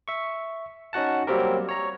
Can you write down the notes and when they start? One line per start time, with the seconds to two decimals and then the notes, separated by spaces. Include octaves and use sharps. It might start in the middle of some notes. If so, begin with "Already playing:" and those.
0.08 E5 C#6
0.93 C#4 D#4 F#4 F#5 A5
1.27 F#3 G3 A#3 C4 G4 A#4
1.69 C#5 A#5